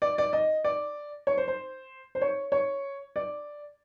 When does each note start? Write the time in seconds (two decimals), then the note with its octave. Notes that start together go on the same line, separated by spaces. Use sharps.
0.02 D5
0.18 D5
0.33 D#5
0.64 D5
1.27 C#5
1.37 C5
1.48 C5
2.15 C5
2.22 C#5
2.52 C#5
3.16 D5